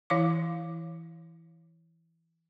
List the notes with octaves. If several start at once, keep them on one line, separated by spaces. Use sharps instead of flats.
E3 E4 F5 D6